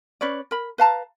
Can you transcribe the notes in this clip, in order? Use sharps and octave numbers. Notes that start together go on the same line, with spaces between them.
C#4 B4 C#5 D5
A#4 B5
B4 F5 A5 A#5